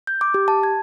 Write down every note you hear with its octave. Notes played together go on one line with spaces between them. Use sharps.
G6
D6
G4
A5
G#6